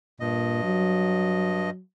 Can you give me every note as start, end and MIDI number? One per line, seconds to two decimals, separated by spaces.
0.20 1.70 43
0.20 0.63 46
0.20 1.70 75
0.64 1.81 54